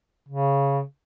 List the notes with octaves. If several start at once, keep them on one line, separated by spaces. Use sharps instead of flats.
C#3